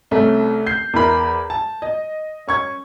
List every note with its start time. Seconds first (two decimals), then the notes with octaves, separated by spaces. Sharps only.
0.11 C2 A3 C#4
0.66 G6 C7
0.93 E2 E4 A#4 B5
1.50 A5
1.82 D#5
2.47 C#4 C#6 G#6